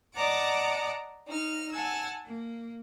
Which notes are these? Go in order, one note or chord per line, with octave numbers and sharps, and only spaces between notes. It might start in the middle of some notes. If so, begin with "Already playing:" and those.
D5 D#5 F#5 A5 A#5 D6
D#4 F6
F#5 G#5 A5 E6
A#3